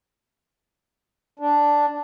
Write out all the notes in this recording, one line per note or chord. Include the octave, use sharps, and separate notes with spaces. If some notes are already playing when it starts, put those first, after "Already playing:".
D4